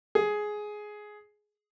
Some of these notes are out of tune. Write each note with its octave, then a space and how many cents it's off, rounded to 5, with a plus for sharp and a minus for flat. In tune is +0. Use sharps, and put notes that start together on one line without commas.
G#4 +10